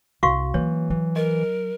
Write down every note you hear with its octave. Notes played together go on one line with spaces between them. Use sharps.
C2 F#4 F5 C#6
E3 F#3 A#3 C#5
E3 F#3
A#4 D#5